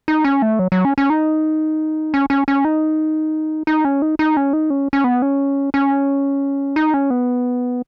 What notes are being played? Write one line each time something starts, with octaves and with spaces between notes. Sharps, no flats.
D#4
C#4
A3
F#3
F#3
C#4
C#4
D#4
C#4
C#4
C#4
D#4
D#4
C#4
D#4
D#4
C#4
D#4
C#4
C#4
B3
C#4
C#4
D#4
C#4
B3